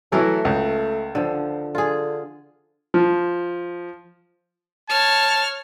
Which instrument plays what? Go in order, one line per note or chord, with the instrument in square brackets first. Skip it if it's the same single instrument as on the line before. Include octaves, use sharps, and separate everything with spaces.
[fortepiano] E3 F#3 E4 [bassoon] A3 [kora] A4 A#4 C#5
[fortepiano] C#2
[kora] D3 F3
[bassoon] D3 [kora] F4 G#4
[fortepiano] F3
[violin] C#5 F6 [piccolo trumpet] A5